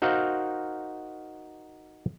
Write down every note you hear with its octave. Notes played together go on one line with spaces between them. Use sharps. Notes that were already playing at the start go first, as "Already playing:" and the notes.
D#4 F#4 A#4 C5 F5 A#5